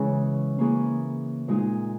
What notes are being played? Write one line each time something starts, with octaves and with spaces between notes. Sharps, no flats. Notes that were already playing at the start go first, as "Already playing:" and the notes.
Already playing: C#3 E3 G#3 C#4 G#4
E3 A#3 C#4 G#4
A#2 G#3 D#4 G#4